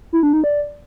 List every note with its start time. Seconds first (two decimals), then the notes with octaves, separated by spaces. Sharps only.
0.13 E4
0.23 D4
0.33 D#4
0.44 D5